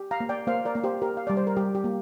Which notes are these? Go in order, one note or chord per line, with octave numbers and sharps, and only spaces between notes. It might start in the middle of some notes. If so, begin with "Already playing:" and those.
Already playing: G4
F5 A#5
A#3
D5 G5
A#3 C5 F5
A#4 D5
A#3
G4 C5
G4 A#4
F5
G3 D5
C5
A#4
G3 G4
G4
A#3